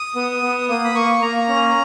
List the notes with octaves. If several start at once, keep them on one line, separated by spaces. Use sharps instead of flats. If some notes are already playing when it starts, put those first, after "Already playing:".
Already playing: D#6
B3
B3
A#3 D#6
B5
A#3 C#6
A#3 A#5
C#4